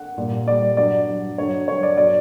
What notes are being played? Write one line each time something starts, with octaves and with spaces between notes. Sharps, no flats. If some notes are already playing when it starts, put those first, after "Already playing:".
Already playing: F#5
A#2 G3
A#2 G3 D5
G2 F#3 D5
G2 F#3
G2 D3 F#3 C#5
G2 D3 F#3 C#5
D5
B2 F#3 D5